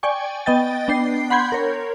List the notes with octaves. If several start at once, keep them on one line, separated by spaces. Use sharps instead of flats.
D5 G5 G#5 C#6
B3 D#5 G5 A6
B3 D4 G5 C7
F#5 B5 C6 G6 G#6
A#4 C#5